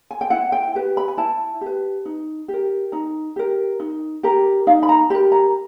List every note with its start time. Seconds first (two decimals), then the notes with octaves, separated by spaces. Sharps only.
0.11 G#5
0.21 G5
0.30 E4 F#5
0.52 G5
0.75 G4 B4
0.97 B5
1.08 G#5
1.17 E4 A5
1.61 G4
1.66 B4
2.05 D#4
2.48 G4
2.53 A#4
2.92 D#4 A#5
3.36 G4 A#4
3.80 D#4
4.23 G4 A#4 A#5
4.67 D#4 F5
4.83 B5
4.89 A#5
5.10 G4 A#4 B5
5.32 A#5